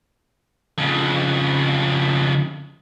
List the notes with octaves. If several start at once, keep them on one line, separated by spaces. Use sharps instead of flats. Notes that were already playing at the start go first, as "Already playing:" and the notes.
F2 C#3